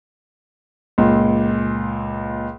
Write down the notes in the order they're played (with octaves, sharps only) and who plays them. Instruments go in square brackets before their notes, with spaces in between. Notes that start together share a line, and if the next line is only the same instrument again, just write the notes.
[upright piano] C#2 A#2